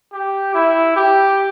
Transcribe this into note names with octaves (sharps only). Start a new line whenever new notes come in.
G4
E4
G4